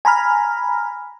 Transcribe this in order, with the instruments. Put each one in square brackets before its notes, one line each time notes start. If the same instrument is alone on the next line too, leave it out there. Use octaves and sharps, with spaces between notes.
[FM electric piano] G#5 A#5 B5 F6